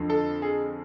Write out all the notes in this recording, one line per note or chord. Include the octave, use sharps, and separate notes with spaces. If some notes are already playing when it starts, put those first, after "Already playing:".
Already playing: F2 D3 F3
A4
G#4